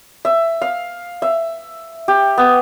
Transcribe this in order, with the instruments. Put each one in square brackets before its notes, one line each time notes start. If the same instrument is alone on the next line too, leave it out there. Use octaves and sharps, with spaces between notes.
[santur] E5
F5
E5
G4
B3